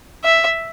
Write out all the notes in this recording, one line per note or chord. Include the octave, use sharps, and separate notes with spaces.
E5